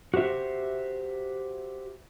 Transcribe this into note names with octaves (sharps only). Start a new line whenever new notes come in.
F#4 G4 C5 E5